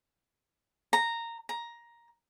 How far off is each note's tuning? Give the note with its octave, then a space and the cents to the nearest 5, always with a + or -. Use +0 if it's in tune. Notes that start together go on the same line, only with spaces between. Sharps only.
A#5 -10
A#5 +10